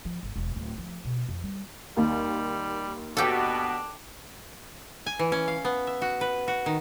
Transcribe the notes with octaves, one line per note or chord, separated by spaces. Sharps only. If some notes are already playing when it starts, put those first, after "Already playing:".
F3
G1
E1
D1
F3
B2
F2
G3
D#2 G3
B2 D4 G4 A4
G#5
E3
C#4
F5
B3
E5
F#4
B4
F#4
D#3